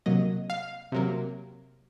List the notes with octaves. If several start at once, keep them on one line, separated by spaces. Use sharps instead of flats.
C3 F#3 A#3 D#5
F5
C3 F#3 A#3